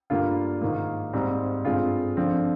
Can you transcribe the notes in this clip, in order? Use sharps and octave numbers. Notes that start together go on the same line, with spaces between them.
G2 D3 G3 A#3 F4
G#2 D#3 A#3
G#2 G3 C4
G2 D3 G#3 C4 F4
D3 F3 C4